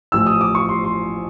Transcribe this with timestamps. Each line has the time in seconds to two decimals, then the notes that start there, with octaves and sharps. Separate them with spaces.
0.12 A1 A2 F3 E6
0.26 D#6
0.41 D6
0.55 C#6
0.69 C6
0.84 C6